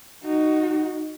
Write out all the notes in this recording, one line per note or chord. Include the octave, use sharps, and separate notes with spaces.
D#4 F#4